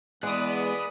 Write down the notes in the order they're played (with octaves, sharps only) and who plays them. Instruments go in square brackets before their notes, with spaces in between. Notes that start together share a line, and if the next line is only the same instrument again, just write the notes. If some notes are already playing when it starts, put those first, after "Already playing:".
[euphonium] E2 [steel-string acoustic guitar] G#3 [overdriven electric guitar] B4 F#5 [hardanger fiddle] D5 D#6